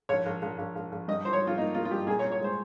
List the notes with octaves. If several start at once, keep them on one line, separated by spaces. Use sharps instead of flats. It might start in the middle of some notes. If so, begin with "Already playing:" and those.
A#1 C#5
A#1
A#1
A#1
A#1
A#1
G2 D#5
F3 C5
C#5
F3
F4
A#3 D#4
A#3 F4
F4
G2 G4
A#2 G#4
C#5
A#2
C#5
G#3 C5